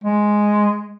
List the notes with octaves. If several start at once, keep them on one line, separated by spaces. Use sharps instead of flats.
G#3